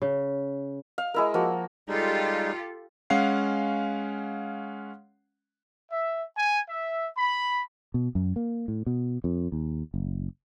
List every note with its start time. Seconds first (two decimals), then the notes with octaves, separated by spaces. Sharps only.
0.02 C#3
0.98 F5
1.14 G#3 E4 A#4
1.34 F3 A#3 F#4
1.88 G3 G#3 D#4 F4 G4 A4
3.10 G#3 C#4 F5 F#5 C7
5.92 E5
6.37 G#5
6.69 E5
7.17 B5
7.94 B2
8.15 F#2
8.36 A#3
8.68 A2
8.86 B2
9.24 F2
9.52 D#2
9.94 F#1